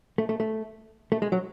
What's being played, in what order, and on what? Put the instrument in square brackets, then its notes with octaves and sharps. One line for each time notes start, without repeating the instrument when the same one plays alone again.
[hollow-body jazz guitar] A3
A3
A3
A3
G#3
F#3